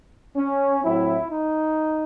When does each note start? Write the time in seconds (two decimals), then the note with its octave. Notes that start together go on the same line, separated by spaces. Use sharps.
0.36 C#4
0.83 A2 F#3 C4 E4
1.31 D#4